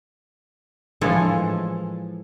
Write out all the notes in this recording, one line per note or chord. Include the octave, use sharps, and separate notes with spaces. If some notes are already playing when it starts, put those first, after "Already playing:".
A2 E3 F3 G#3 A4 G#5